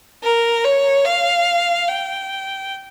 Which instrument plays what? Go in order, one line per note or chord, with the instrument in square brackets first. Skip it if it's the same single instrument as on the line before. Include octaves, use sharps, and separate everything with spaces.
[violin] A#4
C#5
F5
G5